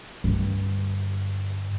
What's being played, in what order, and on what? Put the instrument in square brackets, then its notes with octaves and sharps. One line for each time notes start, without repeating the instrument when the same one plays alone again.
[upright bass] G2 D3